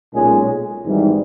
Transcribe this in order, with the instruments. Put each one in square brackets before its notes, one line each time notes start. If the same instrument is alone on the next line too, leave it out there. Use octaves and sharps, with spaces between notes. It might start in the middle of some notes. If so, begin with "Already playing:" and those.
[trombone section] B1 A#2 G#3 C#4 G#4
G#1 G#2 E3 G3